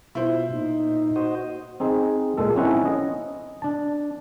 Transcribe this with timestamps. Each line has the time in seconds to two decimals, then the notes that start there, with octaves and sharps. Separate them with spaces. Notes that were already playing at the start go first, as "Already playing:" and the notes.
0.15 B2 E4 F4 C5
0.51 A#2 D#4
1.16 F#4 C5 D#5
1.80 C4 D#4 G#4
2.37 A#2 G#3 A4
2.56 C4 C#4 D#4 E4 F#5 G#5
2.85 D#5
3.62 D4 A5